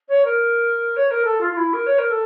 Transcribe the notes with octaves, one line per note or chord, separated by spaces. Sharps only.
C#5
A#4
C#5
A#4
A4
F4
F4
E4
A#4
C#5
A#4
A4